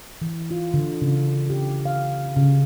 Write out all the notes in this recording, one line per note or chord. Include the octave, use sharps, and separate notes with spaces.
E3
F4
D3
C#3
G4
F5
C#3